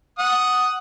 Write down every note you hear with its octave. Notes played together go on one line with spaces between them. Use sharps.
F#5 D#6